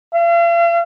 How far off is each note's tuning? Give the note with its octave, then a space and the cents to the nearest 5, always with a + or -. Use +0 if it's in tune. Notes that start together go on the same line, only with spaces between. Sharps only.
F5 -45